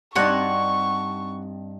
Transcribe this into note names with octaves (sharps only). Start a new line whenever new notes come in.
G2 C4 D#4 C#5 D5 F#5 A5 C#6